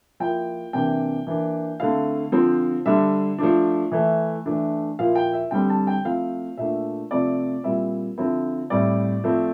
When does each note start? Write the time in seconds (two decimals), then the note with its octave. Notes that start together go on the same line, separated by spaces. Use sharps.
0.20 F3 A#3 E4 G5
0.73 C3 E3 A#3 D4 G5
1.27 E3 A#3 D4
1.80 D3 A3 C4 E4 F5
2.32 D3 F3 C4
2.86 D3 G3 D4 E5
3.39 F3 A3 D4
3.92 E3 A3 E4
4.46 E3 A3 D4
4.99 A#2 F3 A#3 E4 F5
5.15 G5
5.33 E5
5.51 D3 G3 C4 G5
5.70 A5
5.87 G5
6.04 F3 A3 C4 E4 F5
6.57 A#2 A3 D4 E5
7.11 C3 F3 A3 C4 D5
7.64 A#2 G3 C4 E4 E5
8.18 D3 F3 C4 E4
8.70 A2 G3 C4 E4 D5
9.24 F3 A3 C4